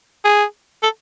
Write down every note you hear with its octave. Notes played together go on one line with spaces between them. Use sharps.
G#4
A4